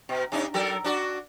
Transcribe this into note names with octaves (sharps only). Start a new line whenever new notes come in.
B2
C3 D4 D#4
F#3 A4 A#4
D4 F#4 D5